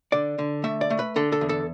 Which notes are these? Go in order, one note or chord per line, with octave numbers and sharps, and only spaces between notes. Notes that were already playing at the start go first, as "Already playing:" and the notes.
D3 D5
D3
A3 E5
D5
A3
B4
D3 A4
A4
E2
A4